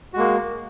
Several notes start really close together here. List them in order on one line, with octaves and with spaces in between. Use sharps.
F#4 G#3 A#3